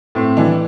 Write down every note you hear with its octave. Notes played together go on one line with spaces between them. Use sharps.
A2 C4
E3 D4